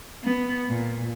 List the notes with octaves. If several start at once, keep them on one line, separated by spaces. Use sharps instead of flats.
B3
A#2